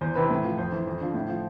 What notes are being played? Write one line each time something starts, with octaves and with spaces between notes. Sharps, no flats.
E2 C5
C3 E3 B4
A2
F3
F2 C5
E3
F2
D3 F3
A2
F3